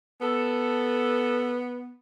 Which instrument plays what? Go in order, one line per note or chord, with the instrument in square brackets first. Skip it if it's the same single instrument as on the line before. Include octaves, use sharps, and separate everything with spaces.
[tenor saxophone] B3 [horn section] A4